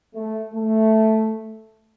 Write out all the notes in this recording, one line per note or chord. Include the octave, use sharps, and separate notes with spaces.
A3
A3